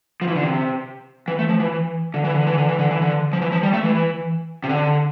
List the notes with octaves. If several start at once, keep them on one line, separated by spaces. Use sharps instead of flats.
F3
E3
D3
C3
E3
A3
F3
E3
D3
E3
D3
E3
D3
E3
D3
E3
D3
F3
E3
F3
G3
A3
E3
C3
D3